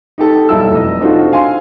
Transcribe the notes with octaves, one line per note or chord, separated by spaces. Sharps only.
D#4 G4 A4
B1 F#2 G3 E4 A4 E6
F1 D#5
C4 D4 D#4 F4 F#4 A4
F5 G#5 C6